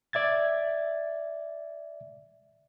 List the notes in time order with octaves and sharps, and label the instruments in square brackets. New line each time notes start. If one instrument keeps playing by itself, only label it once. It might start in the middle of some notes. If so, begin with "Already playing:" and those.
[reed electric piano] D5 E5 G#6 A6